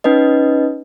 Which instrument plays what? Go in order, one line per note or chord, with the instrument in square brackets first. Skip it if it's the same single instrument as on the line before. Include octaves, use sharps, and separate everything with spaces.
[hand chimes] C#4 D#4 B4 D#5